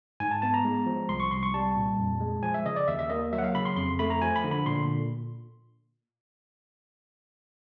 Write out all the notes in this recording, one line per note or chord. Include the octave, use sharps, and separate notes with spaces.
G#2 G#5
A5
B3 A5
A#5
G#3
F3
C2 C6
C#6
C2 C6
C#6
G3 A5
A#2
F2
G#3
F3 G#5
E5
C#3 D#5
D5
D#2 E5
E5
A#3 D#5
F#3 E5
F#5
F5
C#3 B5
C6
F2 C6
A3 B5
A#5
F3 G#5
B5
D3
B5
A#2 C6